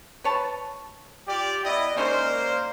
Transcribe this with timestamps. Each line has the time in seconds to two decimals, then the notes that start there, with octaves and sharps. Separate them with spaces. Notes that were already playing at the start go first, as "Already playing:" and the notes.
0.24 B4 C#5 A5
1.27 F4 G4 D5
1.65 B3 E4 D5 D#5
1.97 G#3 A#3 C#4 D#4 A#4 C5